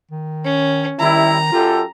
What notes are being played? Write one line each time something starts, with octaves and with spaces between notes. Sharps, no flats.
D#3
C#4
D#2 D#3 G3 E4 A#5
F#2 F4 G4 A4